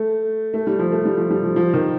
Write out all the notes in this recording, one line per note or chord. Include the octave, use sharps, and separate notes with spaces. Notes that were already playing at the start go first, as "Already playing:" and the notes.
Already playing: A3
A3
G3
F3
A3
G3
F3
G3
F3
F3
D#3